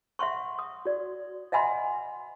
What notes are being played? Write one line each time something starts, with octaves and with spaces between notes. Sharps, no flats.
E5 F#5 C6 C#6
D#6
F#4 D5
D#5 E5 F#5 G#5 B5 C6